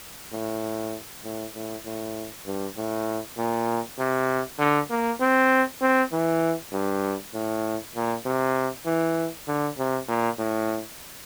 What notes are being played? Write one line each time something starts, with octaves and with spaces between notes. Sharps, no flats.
A2
A2
A2
A2
G2
A2
A#2
C3
D3
A#3
C4
C4
E3
G2
A2
A#2
C3
E3
D3
C3
A#2
A2